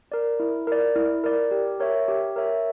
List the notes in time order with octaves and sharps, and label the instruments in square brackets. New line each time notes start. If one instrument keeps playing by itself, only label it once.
[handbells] A#4 D5
E4
A#4 D5
E4
A#4 D5
G4
A#4 C#5 E5
G4
A#4 C#5 E5